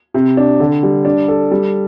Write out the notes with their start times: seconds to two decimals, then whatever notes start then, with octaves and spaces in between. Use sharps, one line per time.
0.14 C3
0.37 D4
0.60 D3
0.83 G3
1.05 D4
1.28 A4
1.52 G3